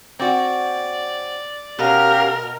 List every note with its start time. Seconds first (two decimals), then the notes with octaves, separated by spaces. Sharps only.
0.19 C4 F#4 D5
1.79 B2 C#4 G4 A#4 F5